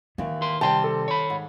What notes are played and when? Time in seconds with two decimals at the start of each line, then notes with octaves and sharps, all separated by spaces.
0.18 D#2 D#3 E3
0.42 A#4 C6
0.61 C3 G3 G4 G5 A5 C6
0.84 A4
1.08 C#5 B5
1.30 G#2